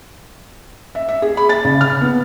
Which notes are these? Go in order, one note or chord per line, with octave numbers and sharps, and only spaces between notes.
E5
E5
G#4
B5
A6
C#3
F6
B3